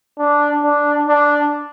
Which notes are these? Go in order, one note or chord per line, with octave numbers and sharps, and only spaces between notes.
D4
D4
D4